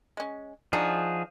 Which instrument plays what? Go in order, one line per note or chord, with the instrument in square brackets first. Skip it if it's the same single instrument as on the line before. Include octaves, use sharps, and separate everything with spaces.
[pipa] G#3 C#4
[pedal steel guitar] F3 G#4 [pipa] D4 D#4 F#4